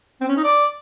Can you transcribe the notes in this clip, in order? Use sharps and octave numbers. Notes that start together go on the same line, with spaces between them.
C4
C#4
D#4
D5